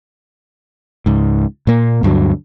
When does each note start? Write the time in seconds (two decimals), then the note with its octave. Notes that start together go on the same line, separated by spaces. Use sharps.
1.06 C#2 G#2
1.67 A#2 A#3
2.03 D2 G2 D3 F#3